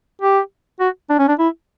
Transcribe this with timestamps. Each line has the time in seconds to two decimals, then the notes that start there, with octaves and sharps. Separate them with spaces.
0.22 G4
0.80 F#4
1.10 D4
1.19 C#4
1.29 D4
1.39 E4